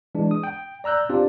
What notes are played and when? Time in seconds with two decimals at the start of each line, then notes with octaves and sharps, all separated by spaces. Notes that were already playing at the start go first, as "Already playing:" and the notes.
0.15 E3 G#3 D4
0.31 D#6
0.43 G5
0.84 D5 A#5 E6 F#6 G6
1.09 C4 D4 F4 G4 D5